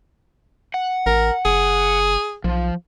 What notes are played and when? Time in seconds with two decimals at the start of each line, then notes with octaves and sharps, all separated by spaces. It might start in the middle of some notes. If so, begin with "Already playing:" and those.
0.74 F#5
1.06 A1 A#4
1.45 F#1 G#4
2.44 B1 F3